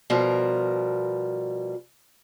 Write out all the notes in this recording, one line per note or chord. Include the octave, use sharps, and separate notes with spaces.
B2 F3 G3 A#4